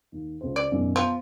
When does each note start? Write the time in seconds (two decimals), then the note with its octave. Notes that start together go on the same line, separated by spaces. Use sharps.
0.12 D#2
0.41 C#2 C5
0.56 D5
0.71 G#1 F#2 B2
0.96 F3 B3